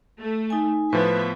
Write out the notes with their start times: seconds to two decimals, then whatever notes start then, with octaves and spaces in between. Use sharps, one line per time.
0.20 A3
0.50 D#4 G#5
0.93 A2 F3 B3 B4 E5